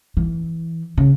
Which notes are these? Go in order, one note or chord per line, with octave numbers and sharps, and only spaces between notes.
E3
C#3